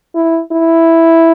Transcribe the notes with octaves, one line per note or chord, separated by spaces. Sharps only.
E4
E4